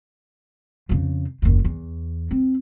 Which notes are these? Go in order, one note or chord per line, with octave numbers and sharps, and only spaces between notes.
F2 C#3
F#1 D#2
E2
C4